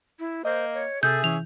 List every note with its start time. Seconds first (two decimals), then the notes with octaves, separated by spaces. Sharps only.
0.19 E4
0.45 A#3 C5 D#5
0.74 C#5
1.03 C3 G#4 A4 E5 G6
1.24 E3 C#4 F7